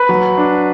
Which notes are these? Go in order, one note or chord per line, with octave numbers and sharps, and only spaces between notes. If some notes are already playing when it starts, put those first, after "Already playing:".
Already playing: B4
F#3
D4